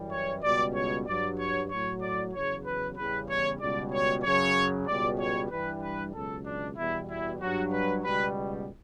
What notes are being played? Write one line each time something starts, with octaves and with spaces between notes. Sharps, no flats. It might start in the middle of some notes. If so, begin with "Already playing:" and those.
Already playing: F#2 E3 G3
C#5
C#2 B2 G3 D5
C#5
G2 F#3 D5
C#5
A2 F#3 C#5
D5
E2 C#3 F#3 C#5
B4
E2 C#3 G3 B4
C#5
C#2 B2 G3 D5
C#5
F#2 C#3 F#3 C#5
C#2 B2 G3 D5
C#5
G2 E3 G3 B4
B4
C#2 B2 F#3 A4
D4
E2 B2 G3 E4
E4
G2 F#3 F#4
B4
C#2 B2 G3 B4